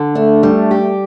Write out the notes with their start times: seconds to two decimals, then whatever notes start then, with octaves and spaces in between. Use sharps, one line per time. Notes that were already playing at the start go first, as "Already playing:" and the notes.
Already playing: D3
0.15 A3 D4
0.43 G3
0.71 G4